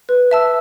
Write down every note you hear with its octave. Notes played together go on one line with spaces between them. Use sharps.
B4
E5 A5 E6